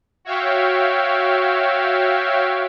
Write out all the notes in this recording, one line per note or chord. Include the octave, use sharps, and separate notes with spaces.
F#4 C#5 E5 F5 G5